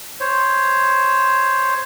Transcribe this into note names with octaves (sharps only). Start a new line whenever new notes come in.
C5 C#5